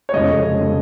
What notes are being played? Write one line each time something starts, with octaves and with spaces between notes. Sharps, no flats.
C#5
F1 F2 C#3 G#3 D#5
C#3 G#3